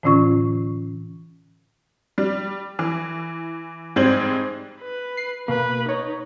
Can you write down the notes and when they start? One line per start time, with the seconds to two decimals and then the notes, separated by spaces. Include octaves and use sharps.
0.03 A2 D3 E3 C#4 F4 C#6
2.18 G3
2.79 E3
3.96 G#2 G3 C4 C5 G#6 F#7
4.81 B4
5.17 C7
5.48 B2 A#3 B4
5.89 D#4 C#5